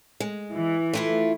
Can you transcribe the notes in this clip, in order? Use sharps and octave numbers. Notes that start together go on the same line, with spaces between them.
G#3
E3
A3 E4 F4